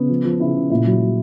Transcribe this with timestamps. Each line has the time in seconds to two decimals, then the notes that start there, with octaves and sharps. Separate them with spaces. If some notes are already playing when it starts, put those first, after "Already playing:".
Already playing: C#3 B3
0.09 F3
0.25 F3
0.40 C#3 E4
0.55 C#3
0.70 A#2 E4
0.86 F#3
1.01 F#3